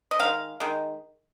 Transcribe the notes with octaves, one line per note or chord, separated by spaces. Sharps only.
D#5
D#3 G#3 F5
D#3 G#3